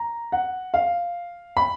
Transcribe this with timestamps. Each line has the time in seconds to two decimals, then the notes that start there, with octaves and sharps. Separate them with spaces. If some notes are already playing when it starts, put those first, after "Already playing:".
Already playing: A#5
0.32 F#5
0.74 F5
1.57 B5